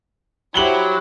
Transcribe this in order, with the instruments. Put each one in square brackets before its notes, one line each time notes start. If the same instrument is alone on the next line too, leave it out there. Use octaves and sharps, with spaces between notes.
[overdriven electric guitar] F#3 [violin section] E4 C5 [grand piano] G4 F#7 G7